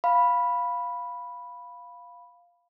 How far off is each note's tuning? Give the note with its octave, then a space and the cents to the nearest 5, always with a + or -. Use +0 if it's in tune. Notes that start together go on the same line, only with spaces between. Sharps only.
F5 +0 B5 -5